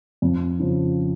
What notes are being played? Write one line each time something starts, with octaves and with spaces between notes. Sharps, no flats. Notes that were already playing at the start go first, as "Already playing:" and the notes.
F2
C#3 F3